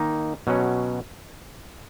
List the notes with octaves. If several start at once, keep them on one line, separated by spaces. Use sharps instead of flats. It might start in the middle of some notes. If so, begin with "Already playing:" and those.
Already playing: D#3 A#3 D#4
B2 F#3 C#4